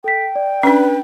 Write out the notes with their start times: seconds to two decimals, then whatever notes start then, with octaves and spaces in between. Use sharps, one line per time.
0.04 A4 G5 B6
0.36 D5
0.63 C#4 D4 B4